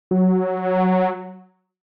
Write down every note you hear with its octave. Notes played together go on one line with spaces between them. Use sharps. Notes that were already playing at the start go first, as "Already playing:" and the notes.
F#3